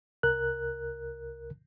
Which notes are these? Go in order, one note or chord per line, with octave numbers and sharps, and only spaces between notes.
C2 A#4 F#6